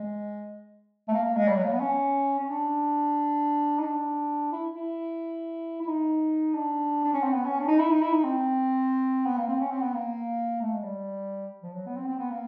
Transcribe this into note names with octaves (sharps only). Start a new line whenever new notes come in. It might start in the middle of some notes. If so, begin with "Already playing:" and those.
Already playing: G#3
A3
A#3
A#3
G#3
G3
F#3
A#3
B3
C#4
C#4
D4
D#4
D4
E4
E4
E4
D#4
D4
D4
C#4
C4
B3
C#4
D4
D#4
E4
D#4
E4
D#4
C4
B3
A#3
C4
C#4
C4
B3
A#3
A3
G#3
G3
F3
F#3
B3
C4
C4
B3
A#3